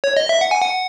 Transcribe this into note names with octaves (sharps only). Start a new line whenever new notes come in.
C#5
D#5
E5
F#5
G#5
F#5